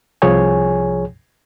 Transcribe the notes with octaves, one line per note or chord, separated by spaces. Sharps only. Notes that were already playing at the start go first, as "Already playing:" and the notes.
C2 F3 G#4 C#5 G#5